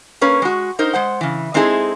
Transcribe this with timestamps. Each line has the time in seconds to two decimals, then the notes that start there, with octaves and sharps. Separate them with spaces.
0.21 A#3 C#4 B4 C#5
0.42 G#3 F#4
0.79 D#4 A#4 C5
0.93 G#3 C5 F#5
1.21 C#3 E3
1.54 G#3 C4 D#4 E4 G#4 A4